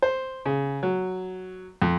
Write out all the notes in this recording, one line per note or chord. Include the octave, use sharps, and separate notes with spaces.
C5
C#3
F#3
F2